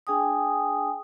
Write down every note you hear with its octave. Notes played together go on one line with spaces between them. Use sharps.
D4 G#4 G5 G#5 D#6